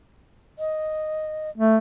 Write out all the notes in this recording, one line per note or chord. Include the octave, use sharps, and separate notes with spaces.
D#5
A3